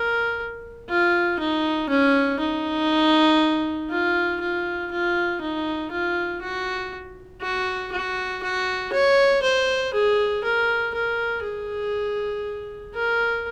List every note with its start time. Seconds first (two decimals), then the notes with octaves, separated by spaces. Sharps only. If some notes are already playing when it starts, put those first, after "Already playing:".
Already playing: A#4
0.89 F4
1.40 D#4
1.90 C#4
2.40 D#4
3.90 F4
4.41 F4
4.91 F4
5.41 D#4
5.91 F4
6.41 F#4
7.41 F#4
7.92 F#4
8.43 F#4
8.93 C#5
9.43 C5
9.93 G#4
10.44 A#4
10.94 A#4
11.43 G#4
12.95 A#4